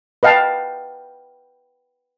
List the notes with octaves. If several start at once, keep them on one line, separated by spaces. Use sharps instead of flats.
B4 D#5 F5 G5 A5